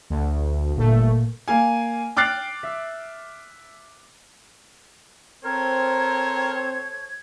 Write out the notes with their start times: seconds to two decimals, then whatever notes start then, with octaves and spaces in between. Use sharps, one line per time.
0.10 D2
0.75 G1 A#2 A3
1.48 A#3 F5 G#5
2.16 G5 D6 F6 F#6 A6 C7
2.63 E5
5.44 C4 A4 A#4 C5 C#5 G#6